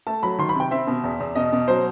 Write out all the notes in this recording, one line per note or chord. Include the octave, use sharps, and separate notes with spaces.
A3 A5
F#3 B5
D#3 C6
B5
C3 G5
C4 E5
B2
E2
E2
B2 D#5
B2
F#3 C5